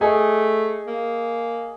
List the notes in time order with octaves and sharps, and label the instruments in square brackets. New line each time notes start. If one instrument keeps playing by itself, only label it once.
[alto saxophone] A3 [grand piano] G#4 D#5 G#5
[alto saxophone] A#3